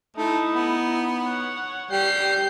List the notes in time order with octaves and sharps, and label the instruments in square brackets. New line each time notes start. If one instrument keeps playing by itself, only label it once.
[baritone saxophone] A3 [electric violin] D#4 E4
[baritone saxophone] B3
[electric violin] C#5 F#5
[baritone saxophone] G3 [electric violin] G6 C7